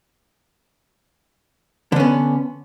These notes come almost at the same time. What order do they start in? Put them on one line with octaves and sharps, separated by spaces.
D3 C#4 B3